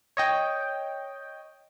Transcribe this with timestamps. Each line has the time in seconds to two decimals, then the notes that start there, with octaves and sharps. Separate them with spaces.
0.17 C#5 D#5 G5